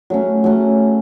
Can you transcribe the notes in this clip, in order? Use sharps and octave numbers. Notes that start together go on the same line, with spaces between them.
F#3 A3 C#4
F#3 A3 C#4